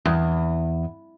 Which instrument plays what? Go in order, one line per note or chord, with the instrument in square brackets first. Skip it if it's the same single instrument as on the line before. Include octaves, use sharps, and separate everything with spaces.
[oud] E2